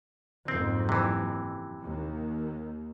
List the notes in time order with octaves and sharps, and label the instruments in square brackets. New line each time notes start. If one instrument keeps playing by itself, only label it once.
[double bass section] F#1 F2 G#2 [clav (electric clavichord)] C4
[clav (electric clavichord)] C3 E3
[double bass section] D#2